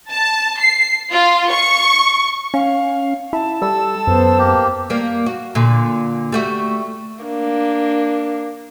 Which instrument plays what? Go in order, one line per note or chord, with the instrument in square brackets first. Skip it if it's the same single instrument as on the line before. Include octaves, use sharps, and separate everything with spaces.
[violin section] A5
C7
F4
C#6
[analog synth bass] C#4 [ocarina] F5
[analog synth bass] E4 [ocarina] A5
[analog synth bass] G3 [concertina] A4 E6
[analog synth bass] F#2 [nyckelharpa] B3 C5
[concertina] A#3 G4
[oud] G3 A#3
F#4
A#2 D3
G3 A3 F#4
[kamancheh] A#3 D4